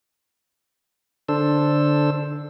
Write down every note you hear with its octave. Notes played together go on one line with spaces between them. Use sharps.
D3 D4 A4 C5 E6